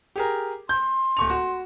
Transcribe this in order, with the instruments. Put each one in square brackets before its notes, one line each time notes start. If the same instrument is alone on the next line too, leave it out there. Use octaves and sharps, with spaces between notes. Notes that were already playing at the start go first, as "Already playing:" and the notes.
[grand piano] G4 G#4 A#4
[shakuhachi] C6 [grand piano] G6
[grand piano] D1 C#6 F7
F#4